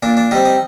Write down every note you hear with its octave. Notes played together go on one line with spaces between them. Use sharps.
A#2 D4
D4
G3 C4 D#4
D#4